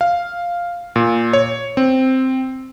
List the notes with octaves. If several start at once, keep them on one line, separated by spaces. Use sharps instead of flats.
F5
A#2
C#5
C4